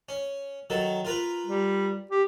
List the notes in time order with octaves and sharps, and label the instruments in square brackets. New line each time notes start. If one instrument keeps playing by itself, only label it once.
[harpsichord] C#4
D#3 F#3 A4
F4 A#4 B4
[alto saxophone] G3
G4